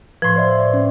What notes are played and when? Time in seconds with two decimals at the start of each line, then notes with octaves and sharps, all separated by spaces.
0.22 A2 F3 B4 C6
0.36 C5 D5 E5
0.60 D5
0.74 C#4